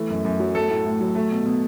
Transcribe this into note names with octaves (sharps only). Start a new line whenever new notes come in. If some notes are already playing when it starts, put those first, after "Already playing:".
Already playing: E3 A3
F#2
F#2
F#3
A3 A4
A2
A2
F#3
A3
B2
B2